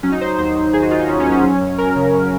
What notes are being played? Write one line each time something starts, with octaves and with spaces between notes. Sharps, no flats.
F#3 C#4
D#4
F#3 C5
D#2 C5
F#3
D#2 G#4
F#4
D#2 F4
D#4
D#2 C#4
C#4
F#3
C#4
F#3
F#2
F#2 A#4
C#3
F#2